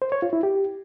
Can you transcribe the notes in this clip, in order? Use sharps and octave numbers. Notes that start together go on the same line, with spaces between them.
C5
C#5
F4
E4
G4